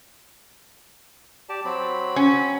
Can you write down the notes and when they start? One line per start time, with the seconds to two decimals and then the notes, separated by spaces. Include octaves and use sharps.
1.49 G4 D5 A5
1.65 F#3 C4 B5
2.16 C#4